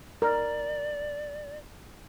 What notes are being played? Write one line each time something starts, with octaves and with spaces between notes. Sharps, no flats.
A#4 D5